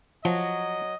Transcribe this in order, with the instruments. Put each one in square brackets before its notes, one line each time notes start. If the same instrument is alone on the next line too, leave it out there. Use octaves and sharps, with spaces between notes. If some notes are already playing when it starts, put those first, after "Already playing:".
[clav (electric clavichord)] F3 [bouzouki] F#3 [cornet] D#5